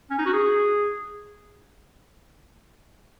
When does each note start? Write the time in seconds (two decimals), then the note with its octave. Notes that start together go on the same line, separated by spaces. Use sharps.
0.10 C#4
0.18 D#4
0.26 F#4
0.33 G#4